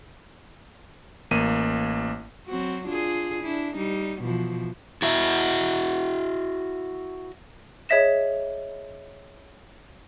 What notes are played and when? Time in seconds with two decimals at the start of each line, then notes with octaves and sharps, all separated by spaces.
1.31 A1 A#3 D#7
2.47 F#3 C4 F#4
2.86 D4 F4 G#4
3.43 D4 E4
3.75 G3 D#4
4.21 B2 E3 F3
5.02 E4 F#4 E5
7.89 G#4 C#5 D#5 E5 A#6 E7